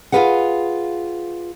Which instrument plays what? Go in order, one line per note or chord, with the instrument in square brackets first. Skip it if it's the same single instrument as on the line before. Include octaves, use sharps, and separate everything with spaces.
[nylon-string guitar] F4 F#4 G#4 B4 F5 F#5